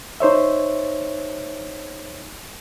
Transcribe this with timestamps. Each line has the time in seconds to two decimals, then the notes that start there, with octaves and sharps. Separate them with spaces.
0.20 D#4 C5 C#5 E5